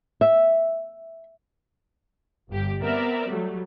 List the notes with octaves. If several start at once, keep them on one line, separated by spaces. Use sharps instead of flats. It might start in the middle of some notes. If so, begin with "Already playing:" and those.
E5
G1 G4
B3 C4 A#4 D5 E5
F#3 G3 A3